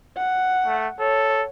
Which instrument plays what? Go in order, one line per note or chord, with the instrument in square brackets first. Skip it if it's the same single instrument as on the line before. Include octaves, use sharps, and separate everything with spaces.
[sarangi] F#5
[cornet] A3
[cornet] A4 [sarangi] C#5